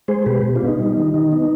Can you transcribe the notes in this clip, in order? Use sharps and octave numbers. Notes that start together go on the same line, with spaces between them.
G#3 G#4 C5
B2 G4 B4
B2
D4 F4
B3
D#4
G3
D#3
D#3 D#4
B3